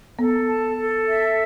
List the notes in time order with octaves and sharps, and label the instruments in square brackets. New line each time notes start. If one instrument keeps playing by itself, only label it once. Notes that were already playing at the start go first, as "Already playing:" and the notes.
[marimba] B3 [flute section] A4
[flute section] A5
A4
E5